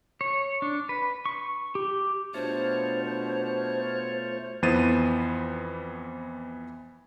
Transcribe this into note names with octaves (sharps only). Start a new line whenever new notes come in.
C#5
D4
B4
C#6
G4
B2 A3 D4 F4 C5 C#5
F2 E3 B3 C5 A6 D#7